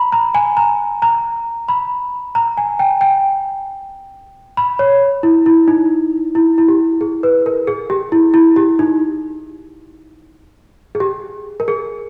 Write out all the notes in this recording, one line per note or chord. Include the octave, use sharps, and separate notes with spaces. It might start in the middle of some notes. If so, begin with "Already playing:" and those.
Already playing: A#5 B5
A#5
G#5
A#5
A#5
B5
A#5
G#5
G5
G5
B5
C#5
E4
E4
D#4
E4
E4
G4
G#4
B4
A#4
G#4
G4
E4
E4
G4
D#4
G#4
G4
A#4
G#4